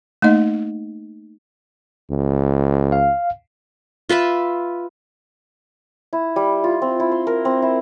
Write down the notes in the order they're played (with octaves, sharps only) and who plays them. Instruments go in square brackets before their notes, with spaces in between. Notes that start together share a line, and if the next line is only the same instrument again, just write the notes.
[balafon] A3 A#3 D#4 D#5
[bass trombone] C#2
[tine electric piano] F5
[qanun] F4 B4 E5 B5
[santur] E4
G3
F4
C4
E4
C6
A#4
C4
E4